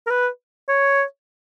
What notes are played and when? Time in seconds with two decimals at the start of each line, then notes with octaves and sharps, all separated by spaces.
0.07 A#4
0.11 B4
0.69 C#5